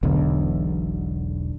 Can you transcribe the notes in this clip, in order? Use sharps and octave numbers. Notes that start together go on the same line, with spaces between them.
E1 B1 E2 D3